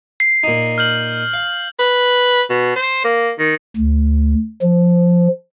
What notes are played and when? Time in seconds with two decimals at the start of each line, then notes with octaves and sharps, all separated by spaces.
0.20 C7
0.43 A#2 D#4
0.78 F6 G6 F#7
1.34 F5
1.79 B4
2.50 B2
2.76 C5
3.04 A#3
3.39 D#3
3.76 D2
4.62 F3